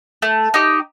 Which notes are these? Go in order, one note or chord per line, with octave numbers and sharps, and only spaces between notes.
A3
D#4 G4